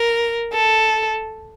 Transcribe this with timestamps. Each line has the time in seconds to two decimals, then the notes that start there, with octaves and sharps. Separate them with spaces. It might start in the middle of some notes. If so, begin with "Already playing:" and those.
Already playing: A#4
0.53 A4